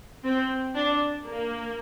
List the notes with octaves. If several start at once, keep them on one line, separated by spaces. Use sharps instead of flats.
C4
D4
A#3